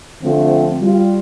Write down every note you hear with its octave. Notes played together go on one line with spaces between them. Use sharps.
D3 F3 A3 C4 F4
G3 F4